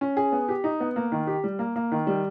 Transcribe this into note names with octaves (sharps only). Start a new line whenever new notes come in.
C#4
G#4
B3
G4
D#4
B3
A#3
D#3
G4
G3
A#3
A#3
D#3
G3